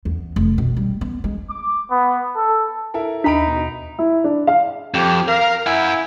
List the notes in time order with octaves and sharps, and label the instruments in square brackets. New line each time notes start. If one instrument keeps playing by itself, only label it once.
[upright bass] E2
F1
B2
G3
B3
G#3
[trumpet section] D6
B3
A4
[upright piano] E4 A4 A#4
[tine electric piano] D#2 B6 [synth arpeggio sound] D4 [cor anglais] D#4 [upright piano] E5 B5 D7
[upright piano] B2
E4
D4
F5
[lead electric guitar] F2 [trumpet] G4
[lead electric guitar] A#4 [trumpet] F5
[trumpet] E4 [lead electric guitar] F#5 G#5